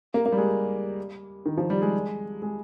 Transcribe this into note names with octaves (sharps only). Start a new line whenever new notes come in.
A#3
A#3
G3
G#3
D#3
F3
G3
G#3
G#3